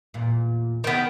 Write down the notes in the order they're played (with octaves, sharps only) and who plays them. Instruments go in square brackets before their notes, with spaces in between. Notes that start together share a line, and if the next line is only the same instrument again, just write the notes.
[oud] E2 A#2
[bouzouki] D#3 B3